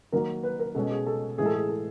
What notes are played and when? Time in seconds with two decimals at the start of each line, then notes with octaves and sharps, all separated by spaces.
0.12 D#3 F#3 A#3 A#4
0.43 B4
0.59 A#4
0.75 B2 G#3 C#4 A4
0.91 G#4
1.07 A4
1.38 A2 E3 G#3 G#4
1.46 A4
1.54 G#4
1.69 A4